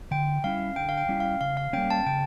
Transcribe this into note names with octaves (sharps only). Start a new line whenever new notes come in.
D3 G5
G3 C#4 E4 F5
D3 G5
F5
G5
G3 C#4 E4
F5
C#3 F5
F5
G3 A#3 C#4 G5
A5
C#3 G5